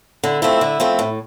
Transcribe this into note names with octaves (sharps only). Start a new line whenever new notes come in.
D3 E4
F3 A3 C4 E4
D3
F3 A3 C4
A2